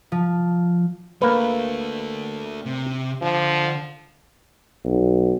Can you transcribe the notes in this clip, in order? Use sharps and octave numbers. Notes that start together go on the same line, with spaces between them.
F3
A3 A#3 D4 B4
C3
D3 F3
B1